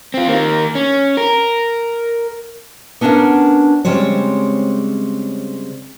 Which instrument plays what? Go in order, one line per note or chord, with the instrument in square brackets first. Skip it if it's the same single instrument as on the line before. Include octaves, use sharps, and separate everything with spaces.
[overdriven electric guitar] C4 F4
D#3 A#3
C#4
A#4
[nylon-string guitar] B3 C#4 D4 A4 A#4 F#5
[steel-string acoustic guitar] C#3 G3 G#3 C4 C5 C#5